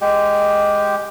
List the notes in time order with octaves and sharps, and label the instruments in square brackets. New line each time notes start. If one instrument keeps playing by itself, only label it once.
[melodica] G#3 G4